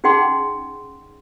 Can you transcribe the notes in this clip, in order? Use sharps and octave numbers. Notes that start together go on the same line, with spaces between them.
C#4 D#4 G#4 F#5 G5 C6